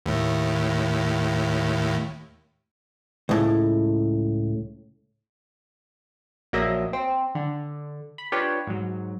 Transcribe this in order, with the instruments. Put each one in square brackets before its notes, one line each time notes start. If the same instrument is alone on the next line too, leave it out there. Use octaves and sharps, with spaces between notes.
[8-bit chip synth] D#2 A2
[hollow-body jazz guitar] C#2 A2
[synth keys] A#1 F#3 A#3 D#5 E5
C4
D3
B5
D4 F4 G4 B4 C#5
G#2 F#3